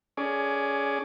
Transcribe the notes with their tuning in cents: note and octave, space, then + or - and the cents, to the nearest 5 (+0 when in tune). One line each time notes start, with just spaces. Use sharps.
C#4 +25 G#4 +10 D5 +15